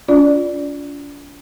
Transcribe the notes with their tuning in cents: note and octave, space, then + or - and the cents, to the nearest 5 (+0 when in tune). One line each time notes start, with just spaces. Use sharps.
D4 -45 F4 +0 D5 +0